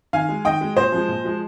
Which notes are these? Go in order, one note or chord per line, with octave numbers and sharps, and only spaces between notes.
D#3 F5 G#5
G#3
D#3 D#5 G5
G#3
A#2 C5 D#5
F3 G#3
A#2
F3 G#3